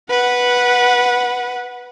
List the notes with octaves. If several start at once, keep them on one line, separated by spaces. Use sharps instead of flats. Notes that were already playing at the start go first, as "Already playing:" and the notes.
B4 F#5